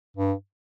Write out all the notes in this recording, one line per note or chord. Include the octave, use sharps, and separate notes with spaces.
G2